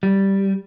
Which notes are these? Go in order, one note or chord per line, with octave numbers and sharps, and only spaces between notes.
G3